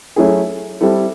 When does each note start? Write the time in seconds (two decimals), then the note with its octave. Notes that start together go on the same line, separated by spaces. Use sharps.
0.16 F#3 A3 C#4 E4 G#4
0.81 G3 C4 E4 A4